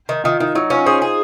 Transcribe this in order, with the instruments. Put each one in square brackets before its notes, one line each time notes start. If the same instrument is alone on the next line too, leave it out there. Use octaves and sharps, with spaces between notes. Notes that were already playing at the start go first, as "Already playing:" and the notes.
[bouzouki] D#3
[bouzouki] D#3 [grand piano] F4
[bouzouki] D#3 [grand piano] D#4
[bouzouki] F#3 [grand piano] D#4
[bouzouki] C#4 [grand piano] F4
[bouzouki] G#4 [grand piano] C5
[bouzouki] G#4